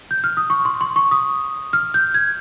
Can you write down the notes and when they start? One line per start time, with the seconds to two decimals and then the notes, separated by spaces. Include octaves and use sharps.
0.11 G6
0.24 F6
0.37 D#6
0.50 C#6
0.65 C6
0.81 C6
0.96 C#6
1.11 D#6
1.73 F6
1.94 G6
2.14 G#6